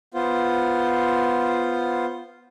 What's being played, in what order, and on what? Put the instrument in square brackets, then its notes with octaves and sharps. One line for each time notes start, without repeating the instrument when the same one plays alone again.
[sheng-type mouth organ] B3 F4 C5